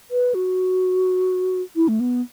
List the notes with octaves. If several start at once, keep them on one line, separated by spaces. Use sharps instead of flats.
B4
F#4
E4
A3
B3